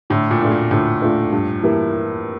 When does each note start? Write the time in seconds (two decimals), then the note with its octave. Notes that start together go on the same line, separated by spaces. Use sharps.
0.10 A2 D3
0.31 A#2
0.41 A3 D4 F4
0.52 A#2
0.71 A2 D3
1.02 A3 D4 F4
1.32 G2
1.63 E3 G3 A#3 E4